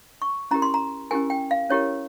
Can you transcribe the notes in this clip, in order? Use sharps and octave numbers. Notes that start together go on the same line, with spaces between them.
C#6
C#4 E4 G4 A#4 A#5
C6
A#5
C#4 E4 G4 A#4 G#5
G5
F5
C#4 E4 G4 A#4 C#5